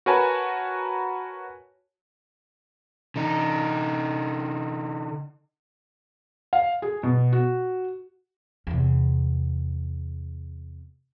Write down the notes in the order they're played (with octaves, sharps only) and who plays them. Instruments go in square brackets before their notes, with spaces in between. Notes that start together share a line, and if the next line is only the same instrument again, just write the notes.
[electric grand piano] F#4 A#4 B4 C#5 G#5 A5
[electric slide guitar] D3 D#4
[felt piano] F5
G#4
B2
F#4
[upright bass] E2 C3